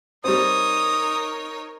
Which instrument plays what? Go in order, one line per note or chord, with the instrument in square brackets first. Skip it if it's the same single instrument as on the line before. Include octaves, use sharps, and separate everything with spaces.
[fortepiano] G3 C4 [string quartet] D#4 A#4 C#5 [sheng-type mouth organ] D#6